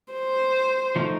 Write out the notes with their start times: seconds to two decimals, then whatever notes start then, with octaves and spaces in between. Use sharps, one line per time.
0.13 C5
0.96 F3 A3 D#4 A#4